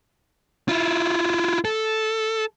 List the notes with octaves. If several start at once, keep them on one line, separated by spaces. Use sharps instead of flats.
E4 F4
A4